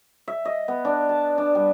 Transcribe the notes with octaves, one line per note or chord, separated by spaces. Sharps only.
E5
D#5
B3
D4
A5
D4
G3